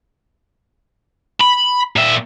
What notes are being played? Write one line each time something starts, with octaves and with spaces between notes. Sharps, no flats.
B5
A#2 E5